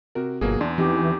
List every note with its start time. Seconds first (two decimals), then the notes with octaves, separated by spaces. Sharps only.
0.15 C3 F#4 A#4
0.41 G1 B2 F#3 A#3 G#4
0.61 E2 D4 C6
0.78 F2 E3 D#4 G4